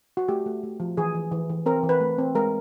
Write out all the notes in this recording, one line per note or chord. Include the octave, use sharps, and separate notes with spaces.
F#4
A3 G4
A3
A3
F3
E3 G#4
E3
E3
E3
C4 A#4
E3
B4
A3
C4
G#3 A#4